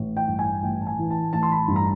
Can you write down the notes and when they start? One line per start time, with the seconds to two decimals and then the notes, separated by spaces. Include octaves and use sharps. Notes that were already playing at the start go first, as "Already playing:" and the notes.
Already playing: A1
0.17 G5
0.28 G2
0.39 G#5
0.63 A1 G5
0.81 A5
0.87 G#5
0.99 E3
1.10 A5
1.33 A1 A5
1.43 C6
1.52 B5
1.68 G2
1.76 A#5